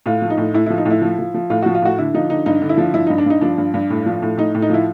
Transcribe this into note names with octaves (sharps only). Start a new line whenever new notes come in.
A2 F4
F3
D#4
A2
A2 E4
F3 E4
D#4
A2
E4
F3
F3
F3
A2 F4
F3 F#4
F4
A2 F#4
D3 E4
F3 D#4
D3 D#4
G2 D#4
D3
E4
F3
G2 E4
G2 D#4
D4
G2 D#4
F3 D4
G2
G2
A2
F3
A2
A2 D#4
A2
D#4
F3 E4